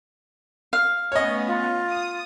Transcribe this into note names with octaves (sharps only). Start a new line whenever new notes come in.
F5
A3 B3 C#4 C#5 D#5
F4
D#6